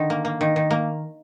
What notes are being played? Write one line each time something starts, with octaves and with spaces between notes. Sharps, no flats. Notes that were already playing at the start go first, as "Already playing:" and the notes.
Already playing: D3 D#3
A#3
A#3
D#3
D#3
A#3